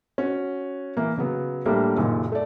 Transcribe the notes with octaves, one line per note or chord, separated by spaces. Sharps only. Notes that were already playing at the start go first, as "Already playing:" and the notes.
C#4 F#4
E3 A#3
C#3 F#3 B3
A2 G3 A3 A#3 D4
F#1 F#2 A#2 D#3
A3 D5